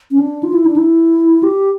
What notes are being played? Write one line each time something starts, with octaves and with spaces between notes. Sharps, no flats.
C#4
D4
F4
E4
D4
E4
G4